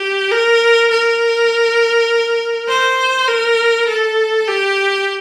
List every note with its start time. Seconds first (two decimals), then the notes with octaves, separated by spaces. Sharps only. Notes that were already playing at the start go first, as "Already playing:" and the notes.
Already playing: G4
0.31 A#4
0.91 A#4
2.68 C5
3.28 A#4
3.88 A4
4.47 G4